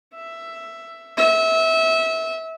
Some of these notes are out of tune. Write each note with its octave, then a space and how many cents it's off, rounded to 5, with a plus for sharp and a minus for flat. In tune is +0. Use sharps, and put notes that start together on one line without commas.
E5 +10
E5 -25